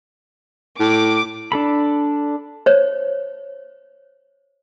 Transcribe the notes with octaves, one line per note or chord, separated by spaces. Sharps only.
A2 D6
D4 A4 B5
C5 C#5